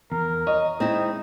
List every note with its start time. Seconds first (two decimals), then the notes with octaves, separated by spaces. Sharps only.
0.12 E2 A#4
0.47 C#5 D#5
0.80 G#3 C4 D#4 E4